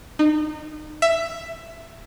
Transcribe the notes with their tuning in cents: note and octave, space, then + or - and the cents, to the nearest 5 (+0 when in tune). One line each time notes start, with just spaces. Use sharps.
D#4 -30
E5 +10